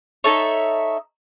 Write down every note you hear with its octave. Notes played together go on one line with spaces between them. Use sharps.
D#4 A4 C#5 E5